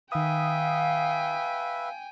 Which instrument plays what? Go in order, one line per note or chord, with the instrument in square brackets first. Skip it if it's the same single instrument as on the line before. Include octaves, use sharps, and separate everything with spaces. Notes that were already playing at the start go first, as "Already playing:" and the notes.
[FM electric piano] D#3 D#6 [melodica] B4 E5 [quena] F5 [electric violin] G5 G#5